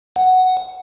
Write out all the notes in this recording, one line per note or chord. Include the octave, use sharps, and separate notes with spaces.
F#5